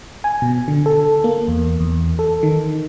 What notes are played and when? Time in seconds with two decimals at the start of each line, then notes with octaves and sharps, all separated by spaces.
0.24 G#5
0.42 B2
0.68 D3
0.86 A4
1.24 A#3
1.48 E2
1.80 E2
2.19 A4
2.43 D#3